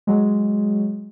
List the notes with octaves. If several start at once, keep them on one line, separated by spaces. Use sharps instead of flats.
F#3 G#3